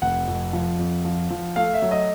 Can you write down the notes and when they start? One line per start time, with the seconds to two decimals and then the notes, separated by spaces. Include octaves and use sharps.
0.02 F1 F#5
0.28 F2
0.53 F3
0.79 F2
1.05 F3
1.30 F3
1.56 A3 F5
1.74 E5
1.82 F#3
1.91 D#5